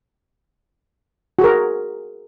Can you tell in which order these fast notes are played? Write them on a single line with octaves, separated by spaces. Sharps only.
F#4 G#4 A#4